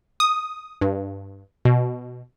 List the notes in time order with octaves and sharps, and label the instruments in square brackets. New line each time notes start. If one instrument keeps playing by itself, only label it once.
[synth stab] D#6
G2
B2